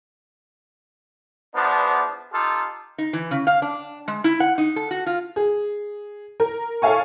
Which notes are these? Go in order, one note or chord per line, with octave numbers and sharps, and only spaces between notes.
E2 F3 B3 D4
D#4 F4 G4 A4
D#4
E3
C#3
F5
D4
G#3
E4
F#5
D#4
A4
F#4
F4
G#4
A#4
A4 C#5 E5 F5 G#5 C#6